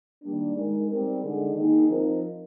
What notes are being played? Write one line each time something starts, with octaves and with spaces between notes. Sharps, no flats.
D#3 G3 A#3 D4
G#3 D#4 A#4
G3 C4 D#4 G4 A#4
D3 G#3 D#4 G#4
D#3 A#3 D#4 G#4
F3 C4 D#4 A#4